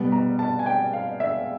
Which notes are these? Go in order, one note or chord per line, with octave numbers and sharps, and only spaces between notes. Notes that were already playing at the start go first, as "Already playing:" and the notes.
Already playing: B2 G3 B3
A#5
A5
G#5
G5
F5
E5